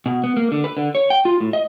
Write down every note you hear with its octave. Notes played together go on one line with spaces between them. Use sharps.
B2
B3
A#3
D3
B4
D3
C#5
G5
F4
A2
D#5